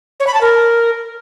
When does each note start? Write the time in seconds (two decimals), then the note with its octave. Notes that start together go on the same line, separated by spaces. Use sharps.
0.20 C#5
0.27 B5
0.34 A5
0.41 A#4